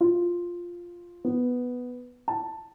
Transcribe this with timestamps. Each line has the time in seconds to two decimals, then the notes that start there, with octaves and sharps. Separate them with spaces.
0.01 F4
1.25 B3
2.28 A5